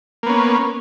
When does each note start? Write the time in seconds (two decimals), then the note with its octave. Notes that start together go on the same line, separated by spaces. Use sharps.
0.23 A#3
0.26 B3
0.29 C#4